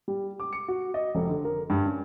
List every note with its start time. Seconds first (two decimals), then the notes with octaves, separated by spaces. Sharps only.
0.08 G3
0.40 D6
0.53 C#7
0.68 F#4
0.94 D#5
1.15 F1
1.29 D3
1.45 A#4
1.70 G2
1.86 C#4